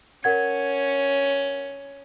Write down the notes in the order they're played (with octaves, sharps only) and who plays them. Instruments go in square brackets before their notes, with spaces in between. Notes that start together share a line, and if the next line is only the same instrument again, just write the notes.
[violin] C#4 [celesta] A#4 F#5 G#6